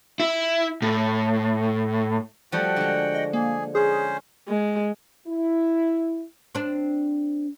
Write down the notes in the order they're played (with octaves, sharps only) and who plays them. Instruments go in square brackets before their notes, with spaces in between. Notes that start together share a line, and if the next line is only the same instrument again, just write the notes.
[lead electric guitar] E4
A2
[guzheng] F3 G3 A3 [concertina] F#4 F#5 G5
[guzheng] D3 G#3
[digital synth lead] D#5
[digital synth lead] A#3 [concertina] G#4
[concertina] C#4 C5 [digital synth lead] G#4
[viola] G#3
[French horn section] E4
[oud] C4 D4